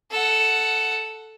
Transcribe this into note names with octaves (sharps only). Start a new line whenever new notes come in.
A4 F#5